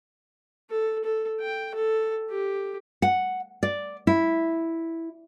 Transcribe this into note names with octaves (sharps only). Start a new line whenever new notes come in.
A4
A4
G5
A4
G4
F#5
D5
E4